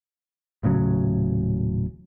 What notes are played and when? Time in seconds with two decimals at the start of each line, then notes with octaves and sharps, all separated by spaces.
0.63 D#1 A2 C#3 F#3